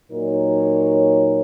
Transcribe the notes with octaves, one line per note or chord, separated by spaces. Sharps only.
A#2 F#3 D#4 A#4 C#5